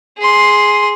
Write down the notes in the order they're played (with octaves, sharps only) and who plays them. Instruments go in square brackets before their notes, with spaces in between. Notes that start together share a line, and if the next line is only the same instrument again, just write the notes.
[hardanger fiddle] G#4 C6